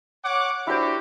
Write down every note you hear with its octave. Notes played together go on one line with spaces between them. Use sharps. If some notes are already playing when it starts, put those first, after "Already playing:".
C#5 F#5 D6
D4 E4 F#4 G4 C5